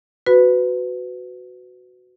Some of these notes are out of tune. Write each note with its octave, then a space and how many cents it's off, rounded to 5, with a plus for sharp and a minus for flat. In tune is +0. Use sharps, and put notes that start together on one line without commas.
F#4 +0 B4 +20 B5 +0